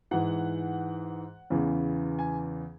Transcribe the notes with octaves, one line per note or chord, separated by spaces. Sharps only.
G#2 E3 F#5
E2 C#3 E3
G#5